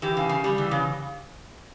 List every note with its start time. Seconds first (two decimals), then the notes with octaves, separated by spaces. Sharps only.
0.02 E3 G4
0.17 C#3
0.29 C#3
0.44 G3
0.58 E3
0.71 C#3